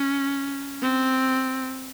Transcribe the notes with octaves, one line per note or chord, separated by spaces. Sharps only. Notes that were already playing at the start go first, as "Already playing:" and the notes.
Already playing: C#4
C4